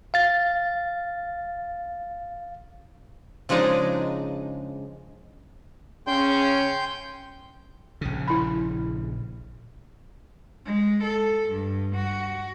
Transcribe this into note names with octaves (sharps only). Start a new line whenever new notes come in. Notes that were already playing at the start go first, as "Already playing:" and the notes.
F5 A6
C#3 F3 G#3 D4 D#4
C#3 C#4 G5 C6 G6
A#1 C#3
E4 B5
G#3
A4
G2
F#4